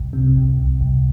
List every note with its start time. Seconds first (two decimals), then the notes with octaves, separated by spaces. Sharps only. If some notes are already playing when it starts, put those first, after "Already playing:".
Already playing: C2
0.13 C3
0.36 C2
0.59 C2
0.81 C2